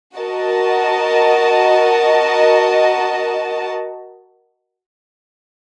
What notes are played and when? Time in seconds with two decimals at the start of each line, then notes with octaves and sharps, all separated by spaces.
0.16 F#4 A#4 D#5 A5